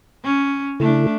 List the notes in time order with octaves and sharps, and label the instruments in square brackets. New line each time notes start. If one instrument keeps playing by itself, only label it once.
[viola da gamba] C#4
[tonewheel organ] C#3 E4 A4 [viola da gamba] A3 D4